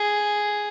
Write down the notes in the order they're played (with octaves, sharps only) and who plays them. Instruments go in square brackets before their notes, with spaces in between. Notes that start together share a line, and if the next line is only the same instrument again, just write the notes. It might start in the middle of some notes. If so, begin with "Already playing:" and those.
Already playing: [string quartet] G#4